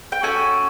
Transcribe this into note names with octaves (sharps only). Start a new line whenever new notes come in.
G5
C#4 F#4 A4 G#5